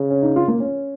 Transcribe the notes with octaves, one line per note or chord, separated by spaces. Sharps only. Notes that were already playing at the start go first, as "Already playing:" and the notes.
Already playing: C#3
C#4
D#4
F4
A#3
C#4